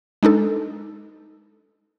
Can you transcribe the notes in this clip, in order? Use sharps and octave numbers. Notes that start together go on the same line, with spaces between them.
G#3 D4 D#4 A4